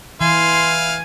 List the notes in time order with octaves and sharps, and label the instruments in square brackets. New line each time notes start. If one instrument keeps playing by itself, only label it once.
[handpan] E3 [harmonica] E4 F5 [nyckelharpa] G#5 [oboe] C6